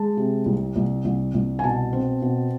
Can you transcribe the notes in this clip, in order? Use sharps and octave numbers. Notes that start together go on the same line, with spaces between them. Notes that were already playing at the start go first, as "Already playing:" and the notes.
Already playing: G#3 A5
C3
C2
C2
C2
C2
G#5
B2 A5
C4
B2